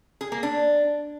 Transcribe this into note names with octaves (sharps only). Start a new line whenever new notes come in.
G#4
A#3
D4